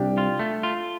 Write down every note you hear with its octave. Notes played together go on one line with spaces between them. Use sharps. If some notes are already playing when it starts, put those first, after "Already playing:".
Already playing: C2 D4 G4
F4
A3
F4